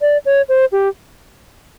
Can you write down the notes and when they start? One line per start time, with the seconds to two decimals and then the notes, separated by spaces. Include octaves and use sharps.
0.01 D5
0.25 C#5
0.49 C5
0.72 G4